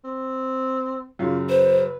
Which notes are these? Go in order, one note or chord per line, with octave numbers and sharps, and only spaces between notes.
C4
F#2 C#3 F4
B4 C5